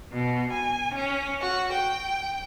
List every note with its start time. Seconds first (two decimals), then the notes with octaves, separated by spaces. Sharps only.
0.12 B2
0.52 G#5
0.94 C#4
1.40 F#4
1.71 G5